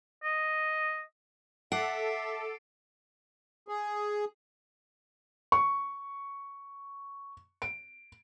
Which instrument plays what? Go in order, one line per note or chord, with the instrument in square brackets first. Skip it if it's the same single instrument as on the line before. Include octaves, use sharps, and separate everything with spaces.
[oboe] D#5
[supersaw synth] A4 [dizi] E5 [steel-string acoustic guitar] F#5 [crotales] D6 C7 D7
[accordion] G#4
[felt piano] C#6
D7